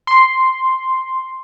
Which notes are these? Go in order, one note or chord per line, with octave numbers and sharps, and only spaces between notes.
C6